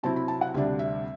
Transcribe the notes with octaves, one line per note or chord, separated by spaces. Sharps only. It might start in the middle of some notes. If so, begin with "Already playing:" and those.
C3 F#3 C4 E4 A5
B5
A5
F#5
D2 C3 G3 D4 E5
E5